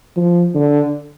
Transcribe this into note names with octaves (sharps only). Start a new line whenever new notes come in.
F3
D3